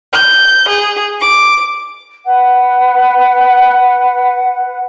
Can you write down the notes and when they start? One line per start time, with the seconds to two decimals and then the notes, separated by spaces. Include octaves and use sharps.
0.12 G6
0.68 G#4
1.19 D6
2.25 B4 F#5